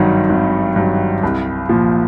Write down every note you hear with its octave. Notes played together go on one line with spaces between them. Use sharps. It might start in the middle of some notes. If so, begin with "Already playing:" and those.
Already playing: G#1 G2 D#3 F#3 G3
G#1
G2 D#3 F#3
C2
A#2 F3